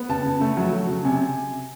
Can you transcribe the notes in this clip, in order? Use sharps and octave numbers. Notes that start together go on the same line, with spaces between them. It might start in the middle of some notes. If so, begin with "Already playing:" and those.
Already playing: B3
C#3 A5
C#3
A3
F#3
F#3
C#3
C3 G#5